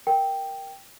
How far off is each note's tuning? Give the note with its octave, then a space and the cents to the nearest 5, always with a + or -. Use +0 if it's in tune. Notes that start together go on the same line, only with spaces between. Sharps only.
A#4 +0 G5 +0